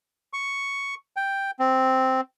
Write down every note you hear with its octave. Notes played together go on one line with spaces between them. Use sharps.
C#6
G5
C4